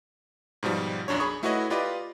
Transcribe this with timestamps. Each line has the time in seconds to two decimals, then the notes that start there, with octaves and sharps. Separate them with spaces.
0.63 G#2 B2 F3 G3
1.08 B1 F#2 D4 C#5
1.20 G#4 B5 C#6 D#6
1.43 A3 E4 F#4 B4 C#5 D#5
1.70 F4 G4 B4 D5 D#5 D6